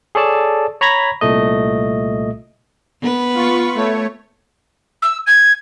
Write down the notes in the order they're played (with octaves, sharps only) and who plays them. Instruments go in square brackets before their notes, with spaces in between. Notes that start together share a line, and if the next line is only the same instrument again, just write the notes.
[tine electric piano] G#4 A4 C#5 D5 A5
C#5 A#5 B5 G#6 A#6 B6
C2 A#2 A3 D#5
[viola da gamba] B3 B4
[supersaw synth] F4 C#6
A3 C#5
[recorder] E6
G#6